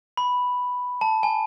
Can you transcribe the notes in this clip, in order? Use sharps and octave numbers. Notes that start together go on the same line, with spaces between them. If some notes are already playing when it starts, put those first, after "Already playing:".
B5
A5
G#5